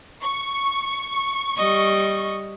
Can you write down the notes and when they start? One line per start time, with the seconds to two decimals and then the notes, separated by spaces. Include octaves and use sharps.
0.23 C#6
1.57 G3 D#5